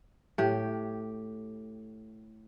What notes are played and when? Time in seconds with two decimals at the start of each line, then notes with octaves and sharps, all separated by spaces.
0.38 A2 G4